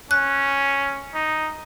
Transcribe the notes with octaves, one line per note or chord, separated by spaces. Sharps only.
C#4 F#6
D#4